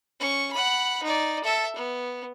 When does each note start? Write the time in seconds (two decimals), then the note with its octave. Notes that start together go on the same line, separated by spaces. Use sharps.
0.20 C#4 C#6
0.53 F#5 B5
1.03 D#4 D5
1.44 A4 E5
1.76 B3